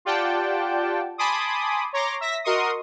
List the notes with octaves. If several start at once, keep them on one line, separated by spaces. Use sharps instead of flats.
F4 G4 D5 F#5 G5 A5
G#5 A5 B5 C6 D6 D#6
C#5 A#5 C6 D6 A#6
E5 A#6 B6
F#4 A#4 D#5 C6 C#6 D#6